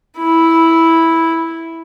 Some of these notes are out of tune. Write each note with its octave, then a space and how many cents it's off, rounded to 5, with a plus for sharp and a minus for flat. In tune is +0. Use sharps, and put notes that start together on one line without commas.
E4 -5